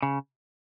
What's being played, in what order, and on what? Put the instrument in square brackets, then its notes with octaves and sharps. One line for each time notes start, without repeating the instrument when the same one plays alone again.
[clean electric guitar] C#3